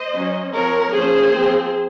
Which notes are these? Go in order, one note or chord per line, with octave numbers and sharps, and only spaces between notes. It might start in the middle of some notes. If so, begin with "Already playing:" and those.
Already playing: C5 D#5
F#3 C#4
F3 C4 A#4 C#5
F3 A#3 C#4 G#4 C5
F3 C4